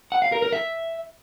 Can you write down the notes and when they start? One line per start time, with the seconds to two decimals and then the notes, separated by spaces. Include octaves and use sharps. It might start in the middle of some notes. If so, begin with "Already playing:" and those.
0.12 F#5
0.22 F5
0.32 A#4
0.42 A#4
0.53 E5